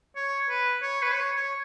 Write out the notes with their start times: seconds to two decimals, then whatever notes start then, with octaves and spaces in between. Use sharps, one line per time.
0.16 C#5
0.49 B4
0.82 C#5
1.02 B4
1.14 C#5
1.37 C#5